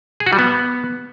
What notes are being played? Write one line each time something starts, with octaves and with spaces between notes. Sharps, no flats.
G#4
F#4
G3
B3